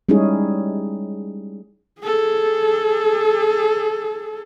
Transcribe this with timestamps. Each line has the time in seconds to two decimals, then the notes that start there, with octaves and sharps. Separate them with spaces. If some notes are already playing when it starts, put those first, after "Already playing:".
0.09 G3 G#3 C#4 D#4 E4 G#4
2.00 G#4 A4